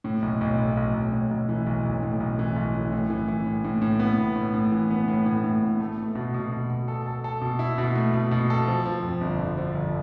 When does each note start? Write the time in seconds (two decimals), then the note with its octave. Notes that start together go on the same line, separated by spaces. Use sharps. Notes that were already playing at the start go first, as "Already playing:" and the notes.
0.04 A2
0.22 B1
0.41 B1
0.58 A2
0.77 B1
0.94 B1
1.12 A2
1.31 B1
1.49 E3
1.66 B1
1.85 B1
2.02 A2
2.20 B1
2.39 E3
2.56 B1
2.75 E3
2.92 A2
3.10 E3
3.28 E3
3.46 A2
3.64 A2
3.82 A2
4.00 B3
4.18 A2
4.36 A2
4.54 A2
4.72 E3
4.91 B3
5.08 A2
5.26 A2
5.44 A2
5.62 B3
5.80 A3
5.98 A3
6.15 B2
6.34 B2
6.52 B2
6.70 B2
6.88 A4
7.06 A4
7.24 A4
7.42 B2
7.59 E4
7.78 B2
7.95 A3
8.14 B2
8.31 B2
8.50 A4
8.67 F3
8.86 F3
9.03 F2
9.21 G1
9.39 D3
9.57 F3
9.75 G1